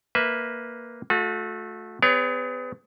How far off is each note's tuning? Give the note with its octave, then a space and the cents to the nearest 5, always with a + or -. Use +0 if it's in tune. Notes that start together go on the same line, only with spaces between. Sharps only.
A#3 +0 B4 +0 E5 -15
A3 -15 F#4 -45
B3 +35 G#4 -35 C#5 +30